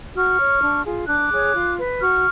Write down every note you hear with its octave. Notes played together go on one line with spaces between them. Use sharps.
F#4 C#6 F6
C#5
D4
F4 G#4
D4 D6 F#6
G#4 C#5
F4
B4
F#4 C#6 F6